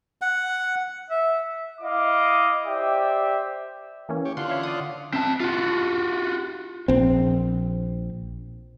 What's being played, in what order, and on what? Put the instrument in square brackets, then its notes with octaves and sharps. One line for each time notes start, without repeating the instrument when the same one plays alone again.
[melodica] F#5
[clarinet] E5
[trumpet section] E4 D#5 F5 D6
G4 C5 D5 E5 G5
[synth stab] E3 A#3 C#4
[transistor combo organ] G4 C#5
[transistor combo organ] D3 F4 F#5 [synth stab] C6
[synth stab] C#5 E5 F5
D5 D#6
[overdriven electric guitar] C4 A5
F4 F#4
[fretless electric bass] A#1 C4